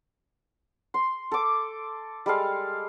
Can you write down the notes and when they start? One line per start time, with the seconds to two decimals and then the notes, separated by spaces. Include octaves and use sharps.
0.94 C6
1.31 A4 D6
2.26 G3 G#3 A4 F5